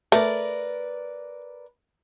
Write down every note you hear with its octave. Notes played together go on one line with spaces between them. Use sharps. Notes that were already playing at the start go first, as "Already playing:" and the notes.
A3 A#4 B4 D5